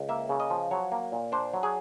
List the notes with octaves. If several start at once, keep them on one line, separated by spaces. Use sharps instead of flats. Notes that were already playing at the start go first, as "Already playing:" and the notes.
Already playing: C#2
A#3 E5
C#3
D#5
F3
F#3 C#5
A#3
A#2
D4 C5
F#3
G#4